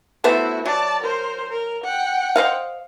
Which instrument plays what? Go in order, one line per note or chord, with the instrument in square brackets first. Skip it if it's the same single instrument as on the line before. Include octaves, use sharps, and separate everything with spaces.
[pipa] A3 B3 C5 [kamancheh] E4 F#4
[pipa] F#3 [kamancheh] D5 A5
[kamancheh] A#4 C5
A#4
F#5 G5
[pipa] C5 D#5 F5